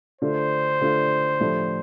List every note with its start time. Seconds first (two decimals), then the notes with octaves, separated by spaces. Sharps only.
0.21 D3 A3 D4 F4 C5
0.81 D3 A3 D4 F4
1.40 A2 F3 A3 D4 G4